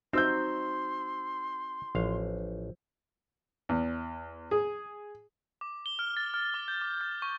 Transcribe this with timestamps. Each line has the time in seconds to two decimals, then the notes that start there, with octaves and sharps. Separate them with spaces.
0.13 C4 D#4 F#4 C5 C6 E6 G6
1.95 A1 F3 F5
3.69 E2
4.51 G#4
5.61 D6
5.86 G7
5.99 F6
6.17 A6
6.34 F6
6.54 D6
6.68 G6
6.81 D6
7.01 G6
7.22 C#6